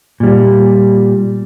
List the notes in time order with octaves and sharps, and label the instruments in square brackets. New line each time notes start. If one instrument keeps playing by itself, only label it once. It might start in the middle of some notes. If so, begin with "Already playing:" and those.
[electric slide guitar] A#2 G3